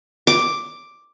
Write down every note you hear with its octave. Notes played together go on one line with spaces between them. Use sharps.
D6